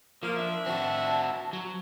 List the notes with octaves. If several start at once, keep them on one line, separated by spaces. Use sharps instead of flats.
F3 A#3
D4 E5
C4 F#4 A5
F#3